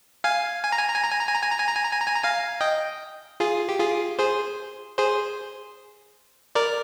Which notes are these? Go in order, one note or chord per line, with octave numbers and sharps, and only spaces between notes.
F5 G#5
G#5
A#5
G#5
A#5
G#5
A#5
G#5
A#5
G#5
A#5
G#5
A#5
G#5
A#5
G#5
A#5
G#5
A#5
G#5
A#5
F5 G#5
D#5 G5
F4 G#4
G4
F4 G#4
G#4 C5
G#4 C5
A#4 D5